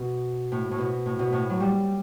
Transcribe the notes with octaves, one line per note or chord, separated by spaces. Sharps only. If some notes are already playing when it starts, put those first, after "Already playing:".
Already playing: B2
A2
A2
B2
A2
B2
A2
F#3
G3